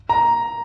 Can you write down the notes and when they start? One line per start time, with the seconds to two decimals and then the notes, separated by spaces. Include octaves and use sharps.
0.09 A#5